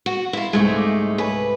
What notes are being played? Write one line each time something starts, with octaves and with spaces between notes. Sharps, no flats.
F#4
E4 F4
C2 G#2 G#3 A3 D#4
D6 D#6
B4 C#5 G#5 B5